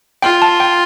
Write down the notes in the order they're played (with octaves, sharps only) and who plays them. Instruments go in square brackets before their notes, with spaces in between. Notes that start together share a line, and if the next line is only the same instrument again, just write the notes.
[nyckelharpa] F4 [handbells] G5
[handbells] A5
G5